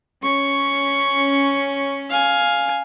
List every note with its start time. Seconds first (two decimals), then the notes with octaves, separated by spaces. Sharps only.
0.24 C#4 C#6
2.10 F5 G#5